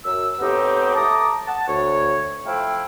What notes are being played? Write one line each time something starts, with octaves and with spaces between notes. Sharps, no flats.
F#2 E6
A2 B3 C4 D#4 G4
A3 A5 A#5 D6 D#6
F#5 A5
D2 C#5
F3 A3 E4 F5 G5